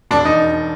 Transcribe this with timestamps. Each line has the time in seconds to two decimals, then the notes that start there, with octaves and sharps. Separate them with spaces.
0.11 E1 D4
0.25 D#4